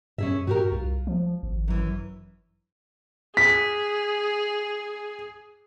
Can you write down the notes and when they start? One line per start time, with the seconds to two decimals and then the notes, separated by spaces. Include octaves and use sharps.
0.18 F#2 C#4 G#4 E5
0.47 G2 F#4 G4 A#4
0.72 C2 F4
1.07 F3
1.43 G#1
1.68 F#2 E3
3.37 G#4 B6